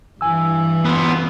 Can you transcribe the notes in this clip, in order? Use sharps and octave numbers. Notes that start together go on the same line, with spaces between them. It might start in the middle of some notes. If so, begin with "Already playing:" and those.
G2 E3 G#5 E6
B3 F4